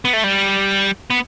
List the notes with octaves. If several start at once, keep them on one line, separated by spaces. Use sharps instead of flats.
B3
A3
G3
B3